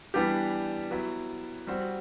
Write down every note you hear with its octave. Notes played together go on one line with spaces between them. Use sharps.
E3 G3 B3 D4 G4
F#3 B3 E4
G3 C4 F#4